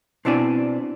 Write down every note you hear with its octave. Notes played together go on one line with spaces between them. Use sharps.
B2 C4 D4 E4 D5 G#5